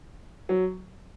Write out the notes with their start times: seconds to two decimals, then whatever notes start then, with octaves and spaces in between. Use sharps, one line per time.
0.49 F#3